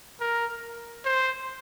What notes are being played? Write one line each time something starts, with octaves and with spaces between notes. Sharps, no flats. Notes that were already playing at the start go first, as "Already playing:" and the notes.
A#4
C5